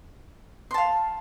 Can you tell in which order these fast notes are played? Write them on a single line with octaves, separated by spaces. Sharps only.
C6 A5 F5